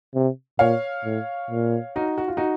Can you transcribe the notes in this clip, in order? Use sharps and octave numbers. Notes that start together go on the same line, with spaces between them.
C3
A#2 C#5 F5
A2
A#2
D#4 F#4
F#4
F4
D#4 F#4